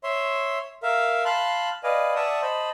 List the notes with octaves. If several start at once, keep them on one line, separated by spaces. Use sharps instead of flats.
C#5 E5 C6
A#4 E5 F5
F5 A5 B5 C6 F#6
B4 D5 D#5 F5 G#5
D5 E5 F#5 A5 C#6 D#6
C5 D#5 A5 B5